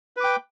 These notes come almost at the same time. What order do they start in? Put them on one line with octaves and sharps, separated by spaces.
B4 D6 G5